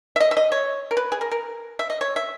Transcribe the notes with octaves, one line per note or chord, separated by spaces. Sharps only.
E5
D#5
E5
D#5
C#5
A#4
B4
G#4
A#4
A#4
E5
D#5
C#5
E5